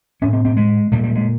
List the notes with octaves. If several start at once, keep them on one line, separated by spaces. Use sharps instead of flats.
A2 C#4
C4
C4
G#3
A#2 G3
G3
G#3